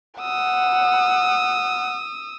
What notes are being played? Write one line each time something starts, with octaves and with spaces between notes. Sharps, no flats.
F#5 D#6 E6